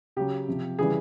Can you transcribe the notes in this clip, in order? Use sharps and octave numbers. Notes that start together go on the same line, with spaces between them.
C#3 F#3 G4
C3 F3
C#3 E3 G3 G#4